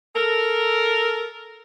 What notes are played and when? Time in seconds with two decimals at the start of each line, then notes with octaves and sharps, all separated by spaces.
0.16 A4 A#4